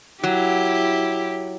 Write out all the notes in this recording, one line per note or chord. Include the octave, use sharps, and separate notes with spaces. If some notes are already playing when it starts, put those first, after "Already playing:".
F#3 E4 G4